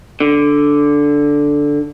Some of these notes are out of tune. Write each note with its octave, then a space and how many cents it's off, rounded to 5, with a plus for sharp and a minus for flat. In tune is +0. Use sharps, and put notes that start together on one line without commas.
D3 -5